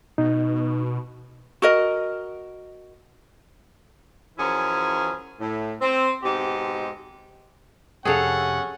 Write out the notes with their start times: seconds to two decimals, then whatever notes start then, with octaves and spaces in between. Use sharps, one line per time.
0.18 B2 D#4
1.62 F#4 A#4 D#5
4.38 F#2 E3 F3 C#4 E4 G#4
5.40 A2
5.81 C4
6.23 G#2 B2 C4 D#4 G4
8.05 F2 C3 C#4 G#4 A4 F5 F#5